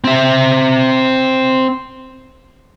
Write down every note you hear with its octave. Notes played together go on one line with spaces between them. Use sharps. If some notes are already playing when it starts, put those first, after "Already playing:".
C4 E5